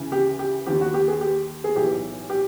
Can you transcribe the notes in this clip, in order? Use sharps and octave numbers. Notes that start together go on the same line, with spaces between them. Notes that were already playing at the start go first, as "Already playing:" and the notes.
Already playing: D2 C#3 E3
G4
G4
D#2 D3 G4
F#4
G4
G#4
G4
G#4
B1 A2 E3 G4
G4